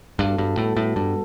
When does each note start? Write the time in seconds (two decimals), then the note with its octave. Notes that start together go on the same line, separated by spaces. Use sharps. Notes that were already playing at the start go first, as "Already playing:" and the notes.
0.19 G2 G3 B3 F#4 A4
0.38 G2
0.57 A2
0.77 A2
0.96 G2